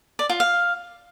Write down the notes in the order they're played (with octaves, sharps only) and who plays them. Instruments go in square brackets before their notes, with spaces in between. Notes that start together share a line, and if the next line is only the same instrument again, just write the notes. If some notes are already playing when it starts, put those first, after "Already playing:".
[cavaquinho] D5
F4
F5